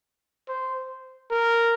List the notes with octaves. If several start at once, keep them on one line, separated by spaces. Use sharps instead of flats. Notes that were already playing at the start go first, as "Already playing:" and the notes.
C5
A#4